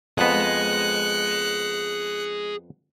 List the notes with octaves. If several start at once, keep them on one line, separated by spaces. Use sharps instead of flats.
F2 B3 G#4 D#5 F#6 C#7